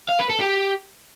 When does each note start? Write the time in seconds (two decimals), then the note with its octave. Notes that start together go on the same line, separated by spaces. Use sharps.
0.09 F5
0.19 B4
0.29 A4
0.40 G4